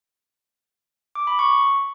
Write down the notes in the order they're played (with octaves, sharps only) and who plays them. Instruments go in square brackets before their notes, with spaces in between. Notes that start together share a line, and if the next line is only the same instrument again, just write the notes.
[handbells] D6
B5
C#6